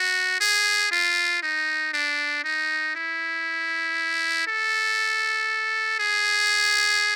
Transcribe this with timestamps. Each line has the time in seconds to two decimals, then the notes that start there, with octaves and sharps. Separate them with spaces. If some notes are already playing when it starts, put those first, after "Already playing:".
Already playing: F#4
0.41 G#4
0.91 F4
1.43 D#4
1.94 D4
2.44 D#4
2.95 E4
4.47 A4
5.99 G#4